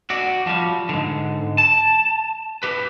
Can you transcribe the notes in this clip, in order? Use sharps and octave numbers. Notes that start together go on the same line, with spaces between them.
F#4 D5
F3 G3
G#2 D3
A5
G4 B4